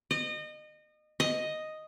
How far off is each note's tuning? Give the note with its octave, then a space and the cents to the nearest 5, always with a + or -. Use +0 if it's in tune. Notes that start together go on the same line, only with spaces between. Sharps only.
D#5 -30
D#5 +0